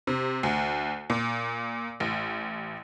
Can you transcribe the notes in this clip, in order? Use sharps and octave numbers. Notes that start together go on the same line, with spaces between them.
C3
D2
A#2
A1